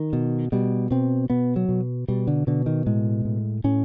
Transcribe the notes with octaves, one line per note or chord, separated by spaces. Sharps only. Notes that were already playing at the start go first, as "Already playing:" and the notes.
Already playing: D#3
B2
B2 G3
B2 C4
B2 B3
F#3
B2
B2 G3
D3
B2 D3
D#3
A2 G#3
A2
A2 C#4